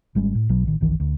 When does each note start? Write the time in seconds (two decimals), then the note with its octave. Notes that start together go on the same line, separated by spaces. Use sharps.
0.15 G#1 G3 G#3 C#4
0.35 A2
0.49 B1 B2 F#3
0.65 A1 D#3
0.81 G1 C2 D#3 E3
1.00 D2